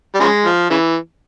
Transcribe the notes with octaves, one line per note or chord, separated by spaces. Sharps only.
G3
C#3 F3 G#3
F3
C#3 E3